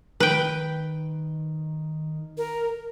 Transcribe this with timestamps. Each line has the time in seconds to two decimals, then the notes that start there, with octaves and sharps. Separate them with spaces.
0.20 D#3 B4 G5
2.37 A#4